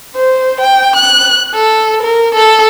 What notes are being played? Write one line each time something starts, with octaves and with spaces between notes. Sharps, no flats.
C5
G5
F#6
A4
A#4
A4